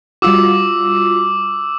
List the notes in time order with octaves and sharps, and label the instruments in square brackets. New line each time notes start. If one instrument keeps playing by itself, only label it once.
[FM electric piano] G3 F4 F#4 [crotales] D6 E6